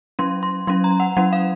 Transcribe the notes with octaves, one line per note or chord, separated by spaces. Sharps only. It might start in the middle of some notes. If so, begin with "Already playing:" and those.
F#3 C#4 C6
C6
F#3 C#4 C6
A#5
F#5
F#3 C#4 F#5
F5